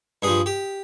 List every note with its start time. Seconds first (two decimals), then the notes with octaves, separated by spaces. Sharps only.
0.22 G2 F3 G#4
0.46 G4